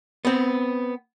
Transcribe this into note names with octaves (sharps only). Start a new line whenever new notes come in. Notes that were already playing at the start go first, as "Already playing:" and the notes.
B3 C4